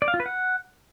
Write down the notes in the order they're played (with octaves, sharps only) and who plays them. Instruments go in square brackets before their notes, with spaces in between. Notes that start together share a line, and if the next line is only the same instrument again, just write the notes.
[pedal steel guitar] D5
F5
F4
B4
F#5